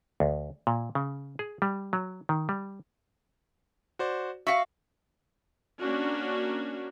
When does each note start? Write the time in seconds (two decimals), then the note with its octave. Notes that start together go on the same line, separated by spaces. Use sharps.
0.20 D2
0.67 A#2
0.95 C#3
1.39 G#4
1.62 G3
1.93 F#3
2.29 D#3
2.49 G3
3.99 F#4 C5 D5
4.47 F#4 E5 F5 B6 C#7
5.79 A#3 C#4 D4 F#4